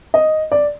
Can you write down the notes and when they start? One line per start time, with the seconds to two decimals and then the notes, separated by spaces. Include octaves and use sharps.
0.14 D#5
0.52 D5